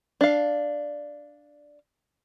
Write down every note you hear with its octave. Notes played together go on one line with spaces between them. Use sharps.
D4 F5